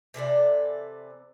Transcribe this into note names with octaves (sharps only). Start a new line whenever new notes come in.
C3 E3 A4 D5